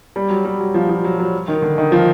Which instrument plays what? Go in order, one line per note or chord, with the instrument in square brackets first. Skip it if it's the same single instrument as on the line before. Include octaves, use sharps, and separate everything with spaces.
[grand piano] G3
F#3
G3
F#3
F3
F3
F#3
F#3
D#3
D3
D#3
F3